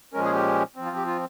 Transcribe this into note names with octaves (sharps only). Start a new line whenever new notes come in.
A#2 F3 G#3 C#4 A#4
G#4
G4
F3 C4
F4
G4
F4